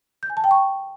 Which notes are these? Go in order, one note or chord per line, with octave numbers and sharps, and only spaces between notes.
G6
G#5
A5
G5
C#6